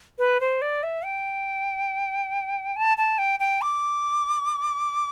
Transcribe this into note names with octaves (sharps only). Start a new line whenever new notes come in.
B4
C5
D5
E5
G5
A5
A5
G5
G5
D6